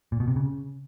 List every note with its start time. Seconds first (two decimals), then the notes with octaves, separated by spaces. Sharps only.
0.12 A#2
0.20 B2
0.28 C3
0.36 C#3